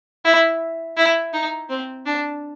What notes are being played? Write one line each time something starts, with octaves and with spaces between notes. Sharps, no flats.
E4
E4
D#4
C4
D4